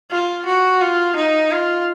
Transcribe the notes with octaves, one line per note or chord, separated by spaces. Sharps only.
F4
F#4
F4
D#4
F4